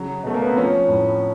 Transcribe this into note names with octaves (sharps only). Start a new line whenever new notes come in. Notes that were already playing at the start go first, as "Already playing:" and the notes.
Already playing: C#3 F#3
B2 A3
A#3
B3
C4
F3 C#4
A2